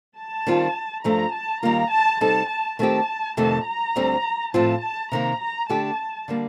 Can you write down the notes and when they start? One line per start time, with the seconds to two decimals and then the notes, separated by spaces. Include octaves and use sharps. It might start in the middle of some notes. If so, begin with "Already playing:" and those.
0.17 A5
0.47 D#3 G3 C4 F4
1.04 G2 F3 A3 D4 A#5
1.33 A5
1.63 D#2 D#3 G3 A#3 F4 A#5
1.92 A5
2.20 C3 G3 C4 D#4 A4 A5
2.50 A5
2.79 D#3 A3 C4 G4 A5
3.37 F2 C3 D#3 A3 A5
3.67 A#5
3.96 D2 D3 G3 C4
4.54 A2 F3 C4 F4 A5
4.82 A5
5.11 C3 D#3 A#3 A#5
5.40 A#5
5.69 D3 A3 D4 G4 A5
6.28 D3 G3 A#3